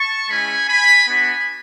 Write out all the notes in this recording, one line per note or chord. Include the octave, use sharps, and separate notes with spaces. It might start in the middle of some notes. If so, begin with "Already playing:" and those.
Already playing: A5 C#6
G#3 C#4 E4 G#5 B5
G#5 B5
B3 D4 F#4 G#5 B5